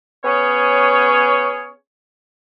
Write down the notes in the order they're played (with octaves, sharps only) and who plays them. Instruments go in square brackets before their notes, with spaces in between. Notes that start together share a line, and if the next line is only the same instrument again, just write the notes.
[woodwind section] B3 C#4 G#4 C#5